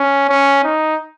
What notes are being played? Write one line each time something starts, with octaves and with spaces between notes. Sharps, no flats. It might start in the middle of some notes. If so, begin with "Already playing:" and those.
Already playing: C#4
C#4
D#4